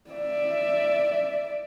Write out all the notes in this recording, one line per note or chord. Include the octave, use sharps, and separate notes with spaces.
D5 E5